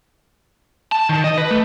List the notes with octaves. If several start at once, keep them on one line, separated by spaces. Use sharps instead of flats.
A5
D#3
D#5
B4
A3